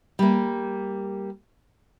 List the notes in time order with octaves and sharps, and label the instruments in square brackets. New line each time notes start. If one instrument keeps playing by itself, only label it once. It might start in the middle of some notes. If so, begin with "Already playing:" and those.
[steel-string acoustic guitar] G3 A#3